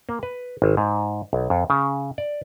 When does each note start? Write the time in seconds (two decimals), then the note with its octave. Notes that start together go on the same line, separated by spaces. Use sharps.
0.09 A#3
0.23 B4
0.62 G#1
0.77 G#2
1.33 B1
1.50 F2
1.70 C#3
2.18 D5